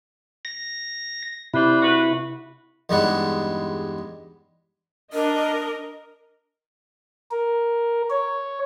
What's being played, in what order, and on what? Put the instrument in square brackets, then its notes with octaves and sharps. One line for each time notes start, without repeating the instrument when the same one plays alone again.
[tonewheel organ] A#6
[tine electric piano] C3 [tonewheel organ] E4 [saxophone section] B4 C5 D5
[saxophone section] F#4 B4
[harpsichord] E2 G2 G3 G#3 D#4 F#5
[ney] D4 [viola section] A#4 D#5
[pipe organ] A#4
C#5